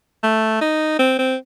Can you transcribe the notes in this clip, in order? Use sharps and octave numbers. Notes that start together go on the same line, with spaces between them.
A3
D#4
C4
C4